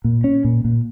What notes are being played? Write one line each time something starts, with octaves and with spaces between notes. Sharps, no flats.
A#2
C#4
A#2
A#2